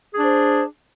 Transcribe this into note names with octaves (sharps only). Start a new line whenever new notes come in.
D4 G#4 C5